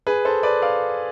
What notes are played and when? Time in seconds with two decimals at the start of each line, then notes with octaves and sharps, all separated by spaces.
0.07 G#4 B4
0.25 A4 C5
0.43 B4 D5
0.62 D5 F5